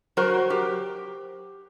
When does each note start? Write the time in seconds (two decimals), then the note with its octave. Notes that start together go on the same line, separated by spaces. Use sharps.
0.17 F#3 F#4 A#4 C5
0.50 G4